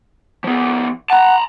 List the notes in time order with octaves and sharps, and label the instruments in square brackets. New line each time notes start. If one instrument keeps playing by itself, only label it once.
[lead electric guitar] F3 B3
[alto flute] F#5 [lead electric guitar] A5 A#5